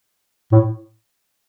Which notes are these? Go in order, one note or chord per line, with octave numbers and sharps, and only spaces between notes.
A2